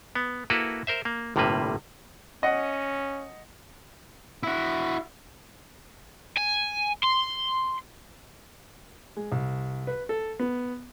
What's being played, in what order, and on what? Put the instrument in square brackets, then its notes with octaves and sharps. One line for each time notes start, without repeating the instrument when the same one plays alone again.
[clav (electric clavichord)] B3
A#3 E4 F#4 A4 B4
A#4 C5 E5
A#3
G1 A2 C3 G3 A#3 B4
[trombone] C#4 [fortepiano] D#5 F#5
[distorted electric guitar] E4 F#4
[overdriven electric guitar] G#5
C6
[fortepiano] G#3
C2
B4
A4
B3